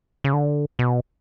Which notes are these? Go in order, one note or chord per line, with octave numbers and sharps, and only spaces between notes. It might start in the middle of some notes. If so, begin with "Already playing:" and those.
C#3
D3
B2